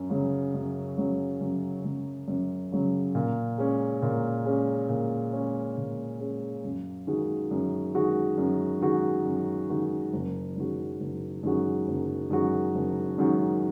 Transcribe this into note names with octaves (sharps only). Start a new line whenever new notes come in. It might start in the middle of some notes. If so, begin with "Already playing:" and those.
Already playing: F#2
C#3 F#3
F#2
C#3 F#3
F#2
C#3 F#3
F#2
C#3 F#3
A#2
G#3 C#4
A#2
G#3 C#4
A#2
G#3 C#4
A#2
G#3 C#4
F#2
D#3 G#3 F#4
F#2
D#3 G#3 F#4
F#2
D#3 G#3 F#4
F#2
D#3 G#3 F#4
F#1
F#2 D#3 G#3 F#4
F#1
F#2 D#3 G#3 F#4
F#1
F#2 D#3 G#3 F#4
F#1
F#2 D#3 G#3 F#4